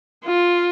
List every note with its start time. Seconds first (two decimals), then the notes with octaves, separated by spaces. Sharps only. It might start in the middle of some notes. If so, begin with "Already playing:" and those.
0.25 F4